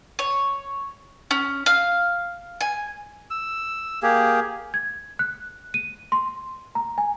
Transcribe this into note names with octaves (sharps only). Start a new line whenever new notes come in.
C#5
C#4
F5
G#5
E6
A#3 G4 G#4
G#6
F#6
D#7
C6
A#5
G#5